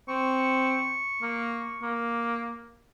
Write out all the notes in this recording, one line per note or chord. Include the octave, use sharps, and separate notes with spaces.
C4 C#6
A#3
A#3